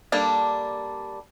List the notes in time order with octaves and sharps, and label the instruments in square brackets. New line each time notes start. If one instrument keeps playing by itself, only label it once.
[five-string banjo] G3 A#3 D4 A4